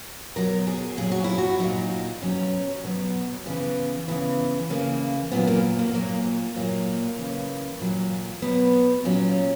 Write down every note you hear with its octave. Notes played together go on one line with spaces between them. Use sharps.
B2 F#3 A#4
G#4
A#2 F#3 G#4
F#4
E4
F#4
A#2 F#3 D#4
B2 F#3 C#4
B2 F#3 B3
C#3 E3 B3
C#3 E3 B3
C#3 E3 A#3
A#2 F#3 B3
A#3
A#3
A#2 F#3 A#3
A#2 F#3 A#3
C#3 E3
A#2 F#3
B2 F#3 B3
A#2 F#3 C#4